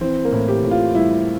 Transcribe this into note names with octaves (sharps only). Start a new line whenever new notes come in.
E3 C4
A#3
A2
G4
A2
F4
G3 E4